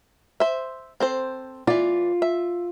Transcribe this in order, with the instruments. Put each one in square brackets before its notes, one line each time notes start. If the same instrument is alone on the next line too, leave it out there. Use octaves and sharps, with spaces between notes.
[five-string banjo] C5 E5
C4 A4 C5
[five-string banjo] E3 D5 [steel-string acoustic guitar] F4
[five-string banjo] E5